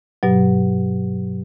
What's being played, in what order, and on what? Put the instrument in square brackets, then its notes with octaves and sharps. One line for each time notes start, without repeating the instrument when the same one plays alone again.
[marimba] G2 B2 F#3